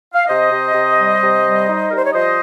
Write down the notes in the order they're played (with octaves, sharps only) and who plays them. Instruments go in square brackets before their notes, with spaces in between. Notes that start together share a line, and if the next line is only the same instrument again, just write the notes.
[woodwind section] F5
C3 C5 D#5
C3
C3
G3
C3
G3
D#4
G3 A#4
C5
C#5
F3 C5 D#5